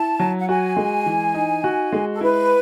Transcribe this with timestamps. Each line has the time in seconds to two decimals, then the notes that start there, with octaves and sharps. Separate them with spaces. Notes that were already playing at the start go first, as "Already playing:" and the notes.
Already playing: E4 A5
0.20 F#3
0.40 F#5
0.49 F#4 G#5
0.77 G#3
1.06 E3
1.34 D#4
1.64 F#4
1.93 G#3
2.14 A4
2.21 E4 B4